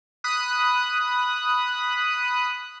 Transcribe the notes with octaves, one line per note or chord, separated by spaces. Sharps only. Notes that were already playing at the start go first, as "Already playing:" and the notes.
B5 D#6 F#6